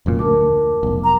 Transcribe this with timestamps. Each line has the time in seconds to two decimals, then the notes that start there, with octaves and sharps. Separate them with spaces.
0.06 F1 F#2 A#2
0.19 D2 A#4 A5 D6
0.83 F1 B1
1.04 A#5